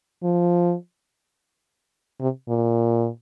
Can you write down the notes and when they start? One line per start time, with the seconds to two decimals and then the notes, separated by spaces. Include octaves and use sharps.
0.23 F3
2.20 C3
2.49 A#2